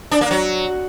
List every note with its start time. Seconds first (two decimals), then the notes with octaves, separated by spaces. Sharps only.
0.11 D4
0.21 A#3
0.31 F#3